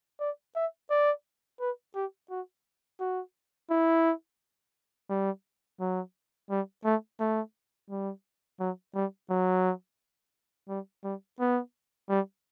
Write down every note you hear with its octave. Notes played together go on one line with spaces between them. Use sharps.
D5
E5
D5
B4
G4
F#4
F#4
E4
G3
F#3
G3
A3
A3
G3
F#3
G3
F#3
G3
G3
B3
G3